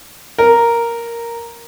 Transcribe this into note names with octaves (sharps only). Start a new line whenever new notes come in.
A#4